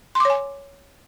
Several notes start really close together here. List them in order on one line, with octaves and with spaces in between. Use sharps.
C6 D6 C#5 G#5